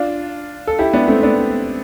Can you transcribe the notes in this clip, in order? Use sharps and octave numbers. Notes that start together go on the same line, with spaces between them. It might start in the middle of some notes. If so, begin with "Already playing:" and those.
Already playing: D4 F4
A4
E4 G4
B3 D4
A3 C4
B3 D4